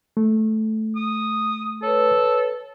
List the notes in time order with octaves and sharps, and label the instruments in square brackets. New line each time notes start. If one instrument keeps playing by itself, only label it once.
[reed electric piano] A3
[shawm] D#6
[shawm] A4 [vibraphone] B4 C#5